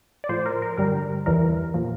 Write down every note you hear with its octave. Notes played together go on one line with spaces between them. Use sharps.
D5
A2 F3 C5
A#4
A#4
G2 D3 G3 A#4
E2 E3 G3 A#4
A#2 F3